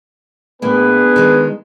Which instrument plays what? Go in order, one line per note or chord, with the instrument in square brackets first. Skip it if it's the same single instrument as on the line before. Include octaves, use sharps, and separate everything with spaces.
[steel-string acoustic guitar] A2 E3 A#3 [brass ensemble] B3 D4 G#4 [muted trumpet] B4
[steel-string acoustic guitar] D#3 G#3 F4